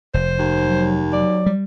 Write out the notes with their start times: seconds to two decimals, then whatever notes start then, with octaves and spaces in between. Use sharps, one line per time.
0.14 F1 C5
0.39 D#2
0.63 F#3
1.13 F#3 D5
1.46 G3